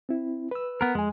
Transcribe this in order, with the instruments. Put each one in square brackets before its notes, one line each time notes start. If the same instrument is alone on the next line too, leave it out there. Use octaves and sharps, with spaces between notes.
[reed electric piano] C4 E4
B4 E6
[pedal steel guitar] B3 A#4
[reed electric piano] F2 G#5 [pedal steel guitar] G#3